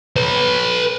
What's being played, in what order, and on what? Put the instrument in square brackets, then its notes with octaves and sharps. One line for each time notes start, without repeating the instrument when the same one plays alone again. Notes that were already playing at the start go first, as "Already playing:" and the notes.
[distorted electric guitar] B4 C#5